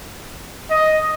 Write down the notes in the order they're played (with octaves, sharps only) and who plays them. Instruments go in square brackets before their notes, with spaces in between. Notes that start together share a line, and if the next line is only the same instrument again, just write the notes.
[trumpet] D#5